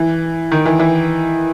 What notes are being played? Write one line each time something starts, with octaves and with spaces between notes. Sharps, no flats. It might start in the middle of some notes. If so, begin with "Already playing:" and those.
Already playing: E3
D#3
E3
E3